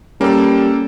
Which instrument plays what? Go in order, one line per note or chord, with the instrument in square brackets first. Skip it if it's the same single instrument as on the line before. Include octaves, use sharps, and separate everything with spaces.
[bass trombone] G3 [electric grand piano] A#3 A4 [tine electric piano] C#4